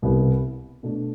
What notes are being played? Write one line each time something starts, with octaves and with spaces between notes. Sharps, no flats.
C2 B2 B3 E4 G4
B2 A3 D4